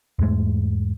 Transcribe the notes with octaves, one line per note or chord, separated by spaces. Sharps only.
E2 G#2 G#3 A3